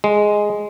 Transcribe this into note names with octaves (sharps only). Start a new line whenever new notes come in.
G#3